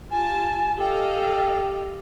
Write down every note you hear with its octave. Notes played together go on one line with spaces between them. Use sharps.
F4 G4 G#5 A5
G4 A4 D#5 F5 G5